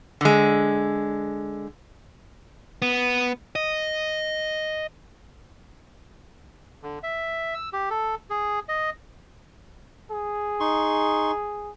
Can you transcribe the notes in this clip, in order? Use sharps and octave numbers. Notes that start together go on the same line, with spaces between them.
D3 G#3
B3
D#5
D3
E5
E6
G4
A4
G#4
D#5
G#4
D#4 C6 C#6